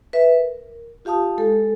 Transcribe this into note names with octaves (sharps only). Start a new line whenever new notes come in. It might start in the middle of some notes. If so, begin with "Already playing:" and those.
B4 E5
A#4
F4 G4 F5 A5 D#6
G#3 A4